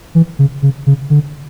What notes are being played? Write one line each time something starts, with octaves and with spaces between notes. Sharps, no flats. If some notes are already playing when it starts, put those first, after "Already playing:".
E3
C#3
C#3
C#3
D3